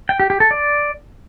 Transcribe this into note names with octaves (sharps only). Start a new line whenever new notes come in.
G5
G4
G4
A4
D5